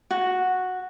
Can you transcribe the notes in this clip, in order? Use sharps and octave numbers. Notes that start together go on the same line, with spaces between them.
F#4